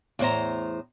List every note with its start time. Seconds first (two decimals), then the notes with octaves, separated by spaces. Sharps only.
0.19 E2 A2 C5 A#5